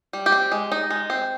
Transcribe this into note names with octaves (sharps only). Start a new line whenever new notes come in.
G3
G4
C4
G#3
D#4
G#3
C4